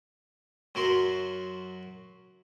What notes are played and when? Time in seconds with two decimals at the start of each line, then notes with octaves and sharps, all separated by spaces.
0.75 F#2 F#3 A#4 C6